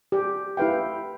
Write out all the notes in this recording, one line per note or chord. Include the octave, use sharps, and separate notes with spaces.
G4
E4 G4 B4 F5 G5